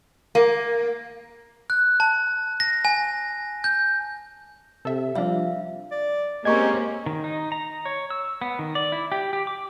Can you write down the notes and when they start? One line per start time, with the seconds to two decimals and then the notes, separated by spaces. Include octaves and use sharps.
0.35 A#3
1.70 F#6
2.00 A5
2.60 A#6
2.85 G#5
3.64 G6
4.85 C3 A4 E5
5.15 F3 G3 D4 E5 F5
5.91 D5
6.45 G#3 A#3 C4 C#4 G4 A#5 C#6 G#6
7.06 D#3
7.24 D#4
7.52 A#5
7.85 C#5
8.10 E6
8.41 B3
8.59 D#3
8.75 D5
8.92 E4
9.12 G4
9.33 G4
9.47 D6